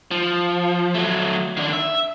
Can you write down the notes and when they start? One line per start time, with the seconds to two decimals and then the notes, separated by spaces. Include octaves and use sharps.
0.11 F3
0.95 F#3 A3
1.57 D#3 D4
1.73 E5